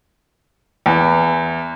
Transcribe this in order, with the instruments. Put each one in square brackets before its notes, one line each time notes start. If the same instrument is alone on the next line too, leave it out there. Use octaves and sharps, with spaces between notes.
[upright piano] E2